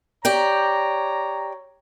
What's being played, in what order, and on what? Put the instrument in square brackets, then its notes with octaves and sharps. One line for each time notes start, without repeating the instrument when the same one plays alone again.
[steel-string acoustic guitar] G4 D5 G5 [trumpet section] C#5 A#5